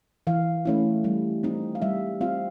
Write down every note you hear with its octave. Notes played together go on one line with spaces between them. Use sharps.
E3 F5
A3 C#4 E4
G3
C4 D#4
F5
G3 E5
C4 F4 F5